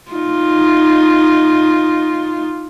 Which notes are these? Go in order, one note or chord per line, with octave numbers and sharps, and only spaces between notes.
D#4 F4